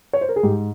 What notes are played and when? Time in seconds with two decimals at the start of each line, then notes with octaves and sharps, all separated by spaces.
0.13 C#5
0.21 C5
0.29 A#4
0.36 G#4
0.43 G#2 G4